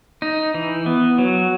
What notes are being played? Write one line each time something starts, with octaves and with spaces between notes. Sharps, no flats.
D#4
E3
B3
F#3